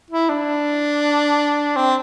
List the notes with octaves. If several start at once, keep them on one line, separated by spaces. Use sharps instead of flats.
E4
D4
C4